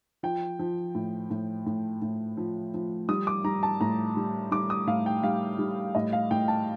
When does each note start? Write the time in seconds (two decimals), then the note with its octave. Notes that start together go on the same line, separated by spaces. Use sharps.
0.23 F3 G5
0.59 F3
0.95 A2
1.30 A2
1.66 A2
2.02 A2
2.37 F3
2.74 F3
3.09 G3 D#6
3.27 D6
3.44 G3 A#5
3.63 A5
3.81 A2 A#5
4.17 G3
4.51 G3 D6
4.70 D#6
4.87 A2 F5
5.06 G5
5.23 G3 F5
5.59 G3
5.95 A2 D#5
6.13 F5
6.31 A2 G5
6.48 A5